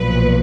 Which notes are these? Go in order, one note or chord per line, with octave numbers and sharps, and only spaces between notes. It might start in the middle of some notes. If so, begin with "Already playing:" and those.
Already playing: B1 A#2 F3 B4